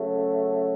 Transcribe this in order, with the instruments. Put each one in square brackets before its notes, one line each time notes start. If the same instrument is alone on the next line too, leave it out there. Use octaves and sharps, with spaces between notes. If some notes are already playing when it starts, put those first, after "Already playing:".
Already playing: [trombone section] C#3 F#3 A3